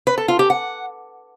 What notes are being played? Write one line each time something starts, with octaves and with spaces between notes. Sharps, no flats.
B4
A4
F4
G4
F#5